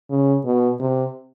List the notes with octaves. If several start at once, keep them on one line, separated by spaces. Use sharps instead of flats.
C#3
B2
C3